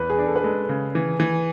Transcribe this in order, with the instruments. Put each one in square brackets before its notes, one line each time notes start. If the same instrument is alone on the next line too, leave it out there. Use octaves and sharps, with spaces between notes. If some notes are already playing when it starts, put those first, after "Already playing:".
Already playing: [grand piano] E2 [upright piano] B4
[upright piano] G#4
[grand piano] D4
[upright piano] A4
B4
[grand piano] G#3 [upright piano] A4
[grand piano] C#3
E3
E3